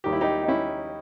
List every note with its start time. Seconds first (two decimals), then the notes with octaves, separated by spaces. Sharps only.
0.04 D#2 D#3 G3 G4
0.13 E4
0.21 D#4 G4
0.43 D#4
0.48 C#4 E4